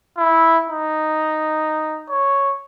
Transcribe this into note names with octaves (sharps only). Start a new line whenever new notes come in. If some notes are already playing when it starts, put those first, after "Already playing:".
E4
D#4
C#5